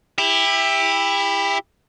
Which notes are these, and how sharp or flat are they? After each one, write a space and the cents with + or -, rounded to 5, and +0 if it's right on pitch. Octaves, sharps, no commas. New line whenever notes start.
E4 +0 G4 +30